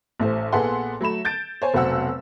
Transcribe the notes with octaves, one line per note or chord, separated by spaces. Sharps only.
A1 A3 C5
A#1 B3 G#4 A4 F#5 C6
F#3 A3 B5 E7
G6 A6 D7
C5 C#5 G#5
F1 B1 F#3 C5 F#5 E6